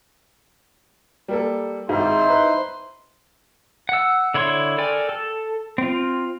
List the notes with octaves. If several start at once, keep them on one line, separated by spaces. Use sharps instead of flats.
G3 A#3 A4
G#1 G#2 D#4 E4 C5 C6
B4
F#5 E6
D3 E4 C#5 C6 C#6
A4 A#4 D5 G5 G#5
A4
C4 F4